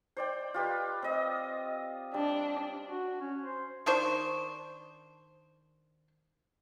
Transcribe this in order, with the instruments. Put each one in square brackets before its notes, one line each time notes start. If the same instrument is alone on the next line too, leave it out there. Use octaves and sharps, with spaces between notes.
[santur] C5 D5 G5
F4 G4 B4
C4 D#5
[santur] G3 [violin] D4
[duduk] F#4
C#4
C5
[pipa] D#3 D4 C5 C#6